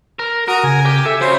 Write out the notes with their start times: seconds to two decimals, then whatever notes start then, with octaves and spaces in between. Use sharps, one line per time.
0.19 A#4
0.48 F#4 A#4 A#5 D#6
0.63 C#3 G#5
0.86 G4
1.05 A4 E5
1.21 C#3 F#4 C5